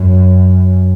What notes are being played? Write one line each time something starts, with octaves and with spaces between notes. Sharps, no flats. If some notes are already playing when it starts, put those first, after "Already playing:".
Already playing: F#2